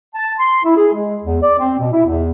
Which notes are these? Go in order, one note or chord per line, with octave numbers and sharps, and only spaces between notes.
A5
C6
E4
G#4
G#3
E2
D5
C4
B2
E4
E2